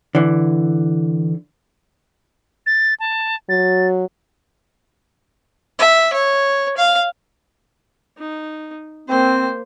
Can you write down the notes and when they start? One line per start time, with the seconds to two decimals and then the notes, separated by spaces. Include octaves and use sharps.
0.15 D3 E3
2.66 A6
3.00 A5
3.49 F#3 A6
5.79 E5
6.13 C#5
6.77 F5
8.18 D#4
9.09 A#3 C4 C5